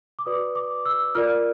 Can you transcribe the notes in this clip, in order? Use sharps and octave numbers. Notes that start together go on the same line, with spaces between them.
D6
F#4 B4 D5 D#6
D6
E6
F4 A#4 D5 F6